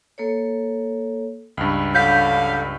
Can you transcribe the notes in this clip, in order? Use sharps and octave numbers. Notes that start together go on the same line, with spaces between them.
A#3 A4 C#5
C#2 G2 B5
D3 F#3 F5 G6 B6